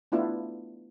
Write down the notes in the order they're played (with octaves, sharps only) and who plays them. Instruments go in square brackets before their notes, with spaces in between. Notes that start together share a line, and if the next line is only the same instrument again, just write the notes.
[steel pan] A3 B3 D4 E4 F4